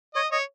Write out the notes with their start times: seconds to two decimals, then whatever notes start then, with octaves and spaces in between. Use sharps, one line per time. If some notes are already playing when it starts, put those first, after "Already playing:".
0.15 C#5 D#5
0.32 C#5 D#5